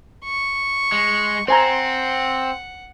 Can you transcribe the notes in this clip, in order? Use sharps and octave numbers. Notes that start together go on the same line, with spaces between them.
C#6
G#3
C4 C5 F#5 G#5 A#5